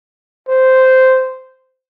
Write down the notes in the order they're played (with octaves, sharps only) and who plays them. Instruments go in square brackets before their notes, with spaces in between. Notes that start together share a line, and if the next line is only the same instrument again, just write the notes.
[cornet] C5